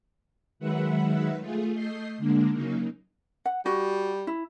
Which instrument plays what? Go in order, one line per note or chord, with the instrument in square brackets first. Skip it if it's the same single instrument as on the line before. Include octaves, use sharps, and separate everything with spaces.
[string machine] D#3 F#3 G#3 B4 E5 F#5
A3 F4 G#4
A3 D#5 G6 C7
D3 G#3 A#3 D4
C#3 F#3 A#3 D#4
[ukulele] F#5
[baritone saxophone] G3 [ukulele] F#4
[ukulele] E4